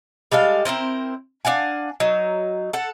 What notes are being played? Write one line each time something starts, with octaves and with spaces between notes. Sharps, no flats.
G3 G#3 A4 F5
C4 E4 A#4 C5
D4 F5 F#5 G#5
F#3 D#4
A4 F#5